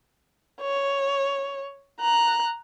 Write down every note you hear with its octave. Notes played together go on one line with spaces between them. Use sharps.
C#5
A#5 F#6